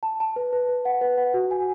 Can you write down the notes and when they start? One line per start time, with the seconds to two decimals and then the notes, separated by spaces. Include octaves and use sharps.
0.03 A5
0.20 A5
0.36 B4
0.53 B4
0.69 B4
0.85 F#5
1.01 B4
1.18 F#5
1.34 F#4
1.51 G#5